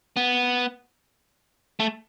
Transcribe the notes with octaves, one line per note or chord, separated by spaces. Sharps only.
B3
A3